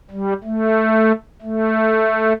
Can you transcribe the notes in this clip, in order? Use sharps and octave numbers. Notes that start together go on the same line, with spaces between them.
G3
A3
A3